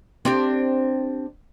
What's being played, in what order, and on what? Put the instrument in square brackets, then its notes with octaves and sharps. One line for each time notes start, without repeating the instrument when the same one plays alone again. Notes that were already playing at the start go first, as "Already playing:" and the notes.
[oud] C4 D4 G4